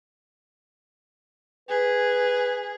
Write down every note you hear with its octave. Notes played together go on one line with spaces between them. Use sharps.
G#4 B4